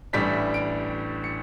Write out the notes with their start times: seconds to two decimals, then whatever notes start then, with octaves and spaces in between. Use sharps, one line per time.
0.13 A1 A2 G3 D4 B6
0.54 D7
1.24 C#7